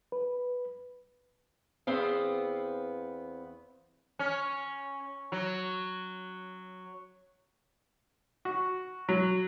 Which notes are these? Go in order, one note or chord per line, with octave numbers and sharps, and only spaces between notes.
B4
E2 B3 C4 F5
C#4
F#3
F#4
F#3